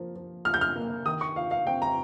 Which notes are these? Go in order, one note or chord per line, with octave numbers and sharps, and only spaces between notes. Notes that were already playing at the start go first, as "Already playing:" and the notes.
Already playing: F3 A#3
F3
F4 F6
G6
F6
A#3
D#3 D#6
C#6
F4 F5
F5
C4 G5
A#5